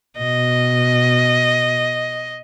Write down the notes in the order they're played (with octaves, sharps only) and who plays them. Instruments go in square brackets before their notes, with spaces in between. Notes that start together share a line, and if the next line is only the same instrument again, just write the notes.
[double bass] B2 [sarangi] D#5